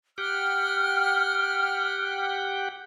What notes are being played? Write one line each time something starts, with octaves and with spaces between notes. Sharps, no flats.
G4 F#5 G5 F6